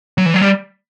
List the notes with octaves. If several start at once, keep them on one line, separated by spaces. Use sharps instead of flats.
F#3
E3
F#3
G3